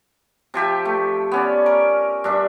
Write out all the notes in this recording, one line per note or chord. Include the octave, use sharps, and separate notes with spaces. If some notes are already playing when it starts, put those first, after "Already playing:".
C3 F3 G4 E5
A3
B3 C#4 D5
A#4
G2 D4 E5